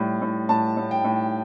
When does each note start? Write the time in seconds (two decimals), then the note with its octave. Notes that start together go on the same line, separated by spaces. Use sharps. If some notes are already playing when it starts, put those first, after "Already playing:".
Already playing: A2 G3
0.22 A2
0.49 A2 A5
0.77 A2
0.91 G5
1.04 A2